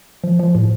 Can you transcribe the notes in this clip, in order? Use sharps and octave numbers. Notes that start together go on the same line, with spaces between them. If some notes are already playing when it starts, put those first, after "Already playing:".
F3
F3
A2